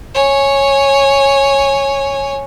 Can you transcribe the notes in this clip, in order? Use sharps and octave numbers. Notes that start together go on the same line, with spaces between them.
C#5 G#5